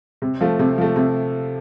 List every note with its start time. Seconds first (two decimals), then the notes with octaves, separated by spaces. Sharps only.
0.22 C3
0.41 F3 A3
0.59 C3
0.78 F3 A3
0.96 C3